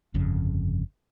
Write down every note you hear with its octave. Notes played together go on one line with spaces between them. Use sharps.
G1 F2 C#3